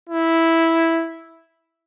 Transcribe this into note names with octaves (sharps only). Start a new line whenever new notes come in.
E4